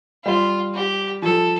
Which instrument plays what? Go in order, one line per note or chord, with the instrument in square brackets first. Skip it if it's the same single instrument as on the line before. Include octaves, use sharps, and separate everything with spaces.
[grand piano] G3 [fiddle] F4
[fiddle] G4
[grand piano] F3 [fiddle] A4